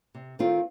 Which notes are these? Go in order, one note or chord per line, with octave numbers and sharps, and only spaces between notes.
C3
D#3 A3 C4 F4